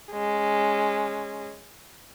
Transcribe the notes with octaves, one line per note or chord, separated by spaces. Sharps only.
G#3 C#4